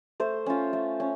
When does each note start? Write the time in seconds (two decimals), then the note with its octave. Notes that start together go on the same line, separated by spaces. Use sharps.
0.20 A3 C5
0.46 C#4 F4
0.73 A3
1.00 C#4